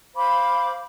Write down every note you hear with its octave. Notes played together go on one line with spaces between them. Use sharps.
C5 F5 B5 D6